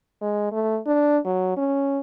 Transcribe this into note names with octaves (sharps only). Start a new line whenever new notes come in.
G#3
A3
D4
F#3
C#4